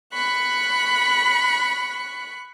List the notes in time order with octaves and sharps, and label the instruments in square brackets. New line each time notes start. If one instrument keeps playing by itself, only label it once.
[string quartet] B5 C#6 F#6